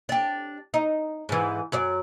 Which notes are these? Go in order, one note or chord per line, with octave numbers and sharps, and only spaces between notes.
D4 G4
D#4
G#2 E3
F#2 F#3 D5